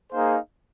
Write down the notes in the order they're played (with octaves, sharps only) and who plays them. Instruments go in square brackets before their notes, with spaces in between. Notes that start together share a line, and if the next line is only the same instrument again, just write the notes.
[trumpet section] A#3 D#4 G#4 C5 F5